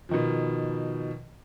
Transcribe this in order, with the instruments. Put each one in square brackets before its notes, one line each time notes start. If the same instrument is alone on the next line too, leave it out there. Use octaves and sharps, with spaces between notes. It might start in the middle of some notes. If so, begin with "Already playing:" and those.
[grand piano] B2 D#3 F3